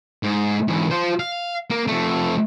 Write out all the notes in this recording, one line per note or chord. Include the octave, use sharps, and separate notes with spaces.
G#2
G#2 E3
F4 C5
F5
A#3
F2 A3